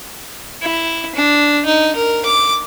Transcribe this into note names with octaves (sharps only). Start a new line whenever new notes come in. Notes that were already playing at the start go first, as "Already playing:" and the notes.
E4
D4
D#4
A#4
D6